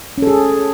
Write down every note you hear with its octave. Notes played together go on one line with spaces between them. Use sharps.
C#4 G#4 A4